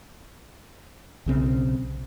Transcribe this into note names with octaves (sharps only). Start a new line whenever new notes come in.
B1 C#3 C4